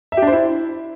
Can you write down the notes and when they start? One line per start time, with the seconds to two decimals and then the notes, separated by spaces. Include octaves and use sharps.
0.12 E5
0.17 G4
0.22 D4
0.27 C5
0.32 E4